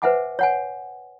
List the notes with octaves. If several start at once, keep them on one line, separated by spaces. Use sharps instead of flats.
B4 C5 E5 F#5 G#5 D6
C#5 F#5 G#5